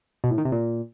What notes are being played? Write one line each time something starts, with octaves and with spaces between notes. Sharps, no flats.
B2
A2
D#3
C3
A#2